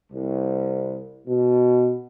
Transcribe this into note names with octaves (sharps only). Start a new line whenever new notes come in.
C2
B2